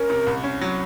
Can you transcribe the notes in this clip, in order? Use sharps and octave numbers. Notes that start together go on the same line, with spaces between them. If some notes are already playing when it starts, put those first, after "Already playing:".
Already playing: C#4 A#4
C3
C2
C#4
F#3